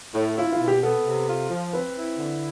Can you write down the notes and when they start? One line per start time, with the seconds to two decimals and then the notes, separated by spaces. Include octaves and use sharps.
0.15 A2
0.37 E4 F4
0.52 F4
0.61 B2
0.68 G4
0.82 B3 A4
1.06 C3
1.28 F4
1.50 F3
1.73 C4 B4
1.96 E4
2.19 D3